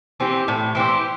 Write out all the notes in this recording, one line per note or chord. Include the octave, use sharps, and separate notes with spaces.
E3 C4 G4
A2
E3 C4 G4